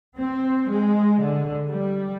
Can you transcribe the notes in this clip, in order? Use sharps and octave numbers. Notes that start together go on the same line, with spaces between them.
C4
G#3
D3
G3